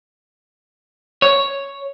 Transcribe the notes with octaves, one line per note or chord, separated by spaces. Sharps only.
C#5